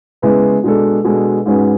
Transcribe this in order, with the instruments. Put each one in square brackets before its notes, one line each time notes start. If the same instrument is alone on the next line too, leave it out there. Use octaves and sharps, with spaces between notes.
[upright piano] C#3 G#3 B3 E4 B4
B2 G#3 D4 A4
B2 G#3 D4 A4
G#2 G#3 C#4 F#4 B4